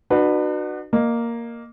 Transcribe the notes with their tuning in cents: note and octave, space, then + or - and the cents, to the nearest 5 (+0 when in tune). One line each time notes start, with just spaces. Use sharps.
D4 +45 F#4 +0 B4 +0
A#3 +0 D#5 -25